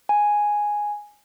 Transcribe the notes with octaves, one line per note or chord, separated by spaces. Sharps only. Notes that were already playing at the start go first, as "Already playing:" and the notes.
G#5